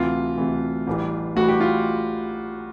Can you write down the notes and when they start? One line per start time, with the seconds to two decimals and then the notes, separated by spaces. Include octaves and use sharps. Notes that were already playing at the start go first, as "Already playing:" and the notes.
Already playing: D2 C3 E3 F4
0.37 D2 C3 E3
0.87 A1 A2 E3 G3
1.36 A1 A2 E3 G3 F#4
1.48 G4
1.60 F4